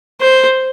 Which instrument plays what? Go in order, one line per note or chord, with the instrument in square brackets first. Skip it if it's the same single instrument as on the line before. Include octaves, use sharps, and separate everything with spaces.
[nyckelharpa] C5